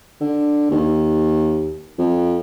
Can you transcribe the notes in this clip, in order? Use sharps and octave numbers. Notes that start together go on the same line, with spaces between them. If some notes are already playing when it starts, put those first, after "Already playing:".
D3
D#2
F2